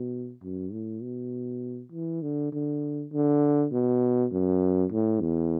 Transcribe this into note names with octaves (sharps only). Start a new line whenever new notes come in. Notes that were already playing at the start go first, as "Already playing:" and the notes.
Already playing: B2
F#2
A2
B2
E3
D3
D3
D3
B2
F#2
A2
E2